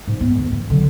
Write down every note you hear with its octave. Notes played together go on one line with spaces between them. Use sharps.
G#2
B3
D2
E3
D3 F#3